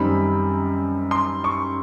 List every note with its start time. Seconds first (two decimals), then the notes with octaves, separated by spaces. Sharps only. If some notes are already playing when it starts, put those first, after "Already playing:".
Already playing: F#2 D#3 G3 C4 B5
1.11 C6
1.44 C#6